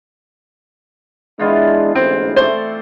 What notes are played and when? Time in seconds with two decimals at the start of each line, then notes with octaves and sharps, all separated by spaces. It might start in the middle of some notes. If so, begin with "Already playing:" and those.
1.39 E3 G#3 B3 D4 F4
1.95 A1 D2 G#2 C4
2.36 A3 C4 C5 D5